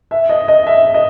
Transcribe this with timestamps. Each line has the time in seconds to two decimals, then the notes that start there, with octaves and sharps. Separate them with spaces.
0.11 E5
0.29 D#5
0.48 D#5
0.67 E5
0.94 D#5